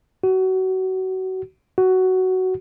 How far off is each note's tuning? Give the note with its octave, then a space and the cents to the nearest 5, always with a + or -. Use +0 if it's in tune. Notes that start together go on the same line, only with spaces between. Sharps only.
F#4 +25
F#4 +10